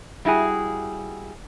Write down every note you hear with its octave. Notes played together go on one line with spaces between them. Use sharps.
G3 E4 F#4 G#4